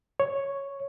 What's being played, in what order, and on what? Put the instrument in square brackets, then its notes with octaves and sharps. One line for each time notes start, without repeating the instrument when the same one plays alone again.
[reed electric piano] C#5